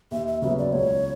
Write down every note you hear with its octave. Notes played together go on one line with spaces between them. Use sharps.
D#2 E5
E5
C#3 F#3 B3 E5
D5
C#2 C#5